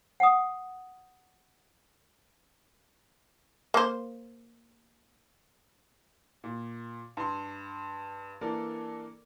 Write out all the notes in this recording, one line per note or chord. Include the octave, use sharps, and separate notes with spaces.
F#5 D#6
A#3 C5
A#2
G2 C6
E3 A#3 D4 A4 A#4 D5